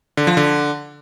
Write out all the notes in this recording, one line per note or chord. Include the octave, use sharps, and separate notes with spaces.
D3
F3
D3